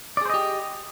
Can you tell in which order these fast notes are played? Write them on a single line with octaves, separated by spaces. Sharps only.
D5 G#4 C5 D#5 G4